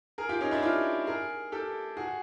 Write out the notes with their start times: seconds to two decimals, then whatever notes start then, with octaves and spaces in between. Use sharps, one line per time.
0.18 G#4 A#4
0.29 F4 G4
0.41 C#4 D#4
0.51 D4 E4
0.62 F4 G4
1.07 G#4 A#4
1.52 G4 A4
1.97 F#4 G#4